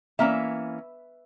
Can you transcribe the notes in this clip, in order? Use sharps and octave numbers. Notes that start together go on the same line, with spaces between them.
E3 A#3 C#4 E5